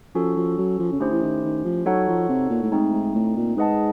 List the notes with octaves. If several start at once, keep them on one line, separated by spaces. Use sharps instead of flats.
F3 C#4 F#4 A4
F3
F#3
F3
C#3
D3 A3 C#4 E4 G4 C5
E3
D#3
D#3
F3
F#3 D#4 F#4 A4 C#5 F#5
F3
C3
A#2
A2
G#2 A3 C4 D#4
G#2
A2
A#2
G#2 G#4 B4 D#5 F#5 A5